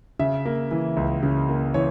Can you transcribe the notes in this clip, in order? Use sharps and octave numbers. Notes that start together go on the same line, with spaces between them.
C#3 E5
A#3
E3
C#2
C#3
A#3
E3 C#5